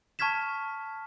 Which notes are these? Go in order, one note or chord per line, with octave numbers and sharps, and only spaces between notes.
A5 C#6 F6 G#6 B6 E7